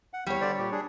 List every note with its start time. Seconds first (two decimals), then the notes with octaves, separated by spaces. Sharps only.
0.13 F#5
0.26 E2 G3 C#5
0.41 D3 C5 D5
0.58 A#2 G4
0.72 D4 G#4